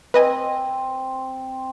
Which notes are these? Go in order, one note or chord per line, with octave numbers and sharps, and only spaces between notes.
C4 B4 D#5 G#5